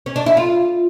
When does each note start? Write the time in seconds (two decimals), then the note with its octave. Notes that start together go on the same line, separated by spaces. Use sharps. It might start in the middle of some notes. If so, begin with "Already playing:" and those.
0.06 C#4
0.16 D4
0.26 E4
0.37 F4